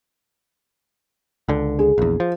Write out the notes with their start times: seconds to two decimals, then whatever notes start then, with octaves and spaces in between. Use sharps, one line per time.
1.48 C#2 D3
1.79 G#4
1.98 A#1 E2
2.20 F3